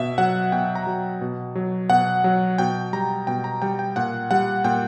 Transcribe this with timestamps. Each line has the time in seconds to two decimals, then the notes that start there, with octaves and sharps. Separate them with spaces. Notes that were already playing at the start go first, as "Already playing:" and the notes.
Already playing: B2 E5
0.18 F#3 F#5
0.52 B2 G5
0.75 A#5
0.87 F#3
1.21 B2
1.55 F#3
1.90 B2 F#5
2.24 F#3
2.58 B2 G5
2.93 G3 A#5
3.27 B2 G5
3.44 A#5
3.62 G3 G5
3.79 G5
3.96 A#2 F#5
4.31 G3 F#5
4.64 A#2 G5